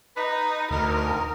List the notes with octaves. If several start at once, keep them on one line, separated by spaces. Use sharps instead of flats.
D#4 B4
D2 D#4 A#4